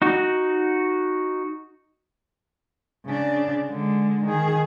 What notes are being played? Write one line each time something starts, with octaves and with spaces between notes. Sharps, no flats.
D#4 F#4
C#3 D4
D3 G#3
D#3 G#4